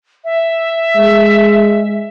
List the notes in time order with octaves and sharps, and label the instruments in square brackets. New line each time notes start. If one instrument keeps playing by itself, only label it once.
[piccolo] E5
[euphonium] G#3